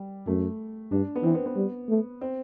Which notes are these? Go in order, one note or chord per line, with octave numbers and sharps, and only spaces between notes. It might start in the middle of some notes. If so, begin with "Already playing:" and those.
Already playing: G3
F#2 A3
G2 D4
B3
E3 C4
B3
B3
G3
A3
C4